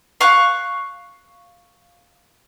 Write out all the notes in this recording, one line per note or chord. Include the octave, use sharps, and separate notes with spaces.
F5 C#6 F#6